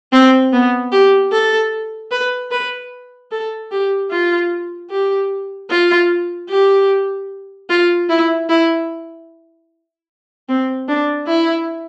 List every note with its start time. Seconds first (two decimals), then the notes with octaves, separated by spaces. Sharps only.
0.12 C4
0.52 B3
0.92 G4
1.32 A4
2.11 B4
2.51 B4
3.32 A4
3.71 G4
4.11 F4
4.90 G4
5.71 F4
6.50 G4
7.70 F4
8.09 E4
8.49 E4
10.48 C4
10.89 D4
11.27 E4